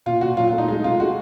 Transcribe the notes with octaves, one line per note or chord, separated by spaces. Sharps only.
A#2 F4
A#2 F#4
F#3 F4
F4
A3
D#4
G#3 D#4
C3 F4
G#3 F#4